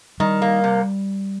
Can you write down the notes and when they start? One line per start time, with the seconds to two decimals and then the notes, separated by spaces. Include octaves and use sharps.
0.20 D#3 G3
0.42 A#3
0.64 C3